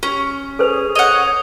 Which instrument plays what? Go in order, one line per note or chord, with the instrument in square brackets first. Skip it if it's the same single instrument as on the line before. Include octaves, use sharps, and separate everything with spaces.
[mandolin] C#4 [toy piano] G4
[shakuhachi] G#4 [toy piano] A4 B4 C5 [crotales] C#6 F7
[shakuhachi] C#5 [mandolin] D#5 F#5 [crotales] D#6 F6 G6